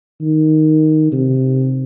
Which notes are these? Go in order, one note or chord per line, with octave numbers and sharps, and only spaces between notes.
D#3
C3